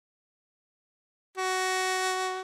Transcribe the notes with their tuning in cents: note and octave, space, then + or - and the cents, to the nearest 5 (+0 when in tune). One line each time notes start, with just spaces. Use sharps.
F#4 +15